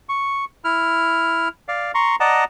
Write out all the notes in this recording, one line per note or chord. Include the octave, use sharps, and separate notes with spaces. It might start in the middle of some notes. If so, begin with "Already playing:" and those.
C#6
E4 F6
D5 F5
A#5 C6 C#6
D5 D#5 F#5 A5 A#5